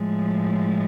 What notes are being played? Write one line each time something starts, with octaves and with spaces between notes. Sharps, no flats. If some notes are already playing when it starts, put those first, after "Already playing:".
Already playing: A2 F3 G#3